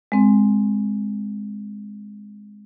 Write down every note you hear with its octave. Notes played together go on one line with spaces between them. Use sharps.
G#3 C4